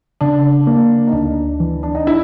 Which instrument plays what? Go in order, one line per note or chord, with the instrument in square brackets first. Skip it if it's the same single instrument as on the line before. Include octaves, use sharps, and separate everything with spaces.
[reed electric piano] C#3 [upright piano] D4
[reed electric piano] A#3
[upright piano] D#4
[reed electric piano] D2 [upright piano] D4
[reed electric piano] E3
[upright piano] D4
D#4
E4